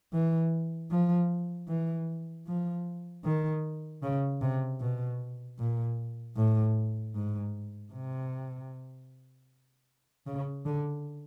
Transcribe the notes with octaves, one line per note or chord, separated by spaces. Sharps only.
E3
F3
E3
F3
D#3
C#3
C3
B2
A#2
A2
G#2
C3
C#3
D3